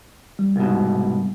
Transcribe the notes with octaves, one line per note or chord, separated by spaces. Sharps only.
G3
C2 G#2 B2